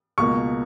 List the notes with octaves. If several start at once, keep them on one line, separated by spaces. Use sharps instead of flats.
C#2 B2 A#3 C#6